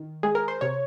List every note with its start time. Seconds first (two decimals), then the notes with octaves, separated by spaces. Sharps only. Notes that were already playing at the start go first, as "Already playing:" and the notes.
Already playing: D#3
0.23 G#3 G#4
0.35 A#4
0.48 C5
0.61 C3 C#5